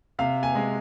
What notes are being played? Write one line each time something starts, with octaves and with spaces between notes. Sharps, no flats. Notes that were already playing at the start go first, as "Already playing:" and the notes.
C3 F5
G#5
G#3